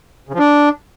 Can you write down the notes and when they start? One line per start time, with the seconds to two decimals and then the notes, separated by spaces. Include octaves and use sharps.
0.29 C#3
0.34 F3
0.39 D4